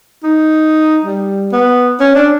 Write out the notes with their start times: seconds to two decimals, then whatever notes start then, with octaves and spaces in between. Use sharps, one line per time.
0.24 D#4
1.05 G3
1.52 B3
2.00 C#4
2.16 D4